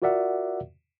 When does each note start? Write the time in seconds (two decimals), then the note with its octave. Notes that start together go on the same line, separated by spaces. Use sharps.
0.02 F4 F#4 A#4 D5 E5 F#5